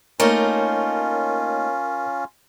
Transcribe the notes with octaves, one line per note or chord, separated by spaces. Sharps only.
A3 A#3 C#4 D#4 F4 A#4 C#5